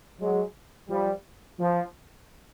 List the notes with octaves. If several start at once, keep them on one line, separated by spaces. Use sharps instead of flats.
F#3 G#3
F3 G3
F3